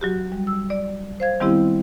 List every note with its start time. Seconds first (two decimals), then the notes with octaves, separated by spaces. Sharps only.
0.01 F#3 F#4 G4
0.32 G3
0.47 E6
0.70 D5
1.20 C5 F5 G#6
1.40 D#3 G3 B3 C4 E4 G4